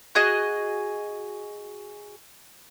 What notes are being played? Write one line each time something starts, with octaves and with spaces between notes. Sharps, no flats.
F#4 G#4 D#5